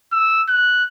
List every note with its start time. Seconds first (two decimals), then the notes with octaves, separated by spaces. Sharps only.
0.12 E6
0.48 F#6